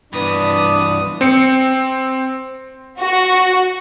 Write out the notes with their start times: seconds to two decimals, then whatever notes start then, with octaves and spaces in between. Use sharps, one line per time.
0.13 G2 E3 B3 D4 D#6
1.21 C4 C#7
2.99 F#4